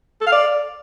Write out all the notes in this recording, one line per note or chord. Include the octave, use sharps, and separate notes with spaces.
A4
F5
D5